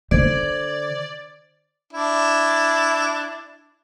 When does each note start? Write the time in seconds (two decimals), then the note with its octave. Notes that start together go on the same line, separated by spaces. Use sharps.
0.11 D3 C5 D5 G#6 D7
1.93 D4 E4